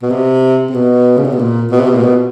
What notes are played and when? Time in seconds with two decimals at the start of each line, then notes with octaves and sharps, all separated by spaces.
0.02 B2
0.10 C3
0.69 C3
0.74 B2
1.17 C#3
1.24 C3
1.32 B2
1.39 A#2
1.71 B2
1.79 C3
1.87 B2
1.95 A#2
2.03 B2